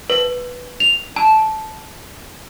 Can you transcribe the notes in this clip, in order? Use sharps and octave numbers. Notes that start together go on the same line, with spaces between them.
B4
F7
A5